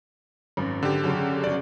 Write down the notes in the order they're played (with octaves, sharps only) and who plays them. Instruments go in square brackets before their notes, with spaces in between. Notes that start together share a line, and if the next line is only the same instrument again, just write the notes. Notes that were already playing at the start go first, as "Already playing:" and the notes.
[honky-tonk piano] G#1 F#2
[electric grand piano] D3 G4
[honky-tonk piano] F#2 C#3 F#3
[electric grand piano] G1 D5